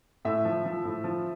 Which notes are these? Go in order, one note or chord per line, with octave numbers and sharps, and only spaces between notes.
A2 E5
F3
F3
A2
F3